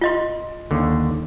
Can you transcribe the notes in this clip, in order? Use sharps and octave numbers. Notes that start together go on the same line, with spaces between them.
F4 D#5 C6
D#2 D3